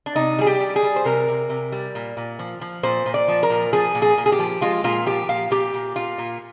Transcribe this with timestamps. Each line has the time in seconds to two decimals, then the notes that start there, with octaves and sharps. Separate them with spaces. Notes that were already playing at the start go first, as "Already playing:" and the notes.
0.06 D4
0.16 C3 D#4
0.39 G3 G#4
0.47 G4
0.60 G3
0.76 G#4
0.83 G3
0.96 C5
1.05 C3 A#4
1.28 C3
1.49 C3
1.72 G3
1.95 A#2
2.17 A#2
2.39 F3
2.61 F3
2.83 A#2 C5
3.06 A#2
3.14 D5
3.28 F3
3.43 A#4
3.50 A#2
3.73 F3 G#4
3.95 A#2
4.02 G#4
4.18 A#2
4.26 G#4
4.32 G4
4.39 F3
4.61 G#3 F4
4.84 A#2 F4
5.06 F3 G4
5.29 A#2 F5
5.51 A#2 G4
5.74 A#2
5.96 A#2 F4
6.18 A#2